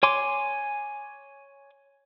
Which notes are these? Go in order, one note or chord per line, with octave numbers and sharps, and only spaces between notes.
C#5 G#5 C6 D6